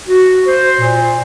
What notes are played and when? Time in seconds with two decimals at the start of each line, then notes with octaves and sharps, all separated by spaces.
0.08 F#4
0.47 C5
0.80 A#2